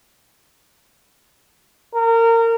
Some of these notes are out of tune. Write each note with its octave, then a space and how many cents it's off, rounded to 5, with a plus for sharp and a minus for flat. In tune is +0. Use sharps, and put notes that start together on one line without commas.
A#4 -25